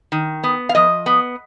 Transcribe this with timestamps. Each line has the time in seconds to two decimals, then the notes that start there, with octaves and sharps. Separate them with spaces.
0.12 D#3
0.44 B3
0.69 F5
0.75 F3 D#5
1.06 B3